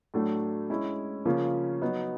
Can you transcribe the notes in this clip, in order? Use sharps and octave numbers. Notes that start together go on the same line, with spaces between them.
A2 F#3 A3 D4
G#3 C#4 E4
C#3 F3 A#3 C#4 F4
F#3 B3 D#4